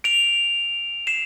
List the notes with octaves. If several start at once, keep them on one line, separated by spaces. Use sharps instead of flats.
D7 F7
C7 E7